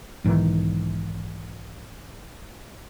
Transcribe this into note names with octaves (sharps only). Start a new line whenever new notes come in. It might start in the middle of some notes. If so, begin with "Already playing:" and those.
B1 G#2 D#3 E3